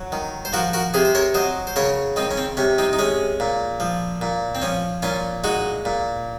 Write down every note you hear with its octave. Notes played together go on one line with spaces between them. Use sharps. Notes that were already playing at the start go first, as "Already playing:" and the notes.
Already playing: F#3
D#3
C5
F3 F#4 A#4
F#4 A#4
C3 G#4 C5
C5
A#4 C#5
F#3 C5 D#5
C5
C#3 A#4 C#5
D#3 C4 D#4
C#4
C4
C3 C#4
C4 D#4
D#4
G#3 C#4
A#2
F3
A#2
C4
F3 C#4
A#2 C#4 F4
G#3 D#4 F#4
A#2